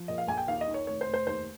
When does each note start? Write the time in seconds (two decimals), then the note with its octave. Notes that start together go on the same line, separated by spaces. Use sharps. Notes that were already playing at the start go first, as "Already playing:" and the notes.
Already playing: F3
0.08 A#2 D#5
0.18 F5
0.28 A#1 G#5
0.37 G5
0.47 D#2 F5
0.61 D#5
0.67 D#3
0.74 C#5
0.87 F1 C#5
1.01 C5
1.08 F1
1.14 C5
1.27 D#2 C5